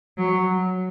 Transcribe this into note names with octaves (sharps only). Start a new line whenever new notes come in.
F#3